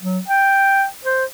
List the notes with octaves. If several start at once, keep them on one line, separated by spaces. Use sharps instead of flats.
F#3
G5
C5